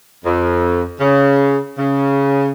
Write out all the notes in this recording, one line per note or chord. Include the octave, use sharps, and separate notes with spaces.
F2
C#3
C#3